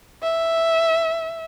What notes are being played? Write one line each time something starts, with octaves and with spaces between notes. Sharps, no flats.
E5